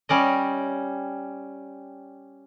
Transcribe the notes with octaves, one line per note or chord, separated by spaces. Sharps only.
G3 C#4 D5 D#5